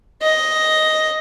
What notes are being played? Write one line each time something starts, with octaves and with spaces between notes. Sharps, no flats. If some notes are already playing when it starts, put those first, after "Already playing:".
D#5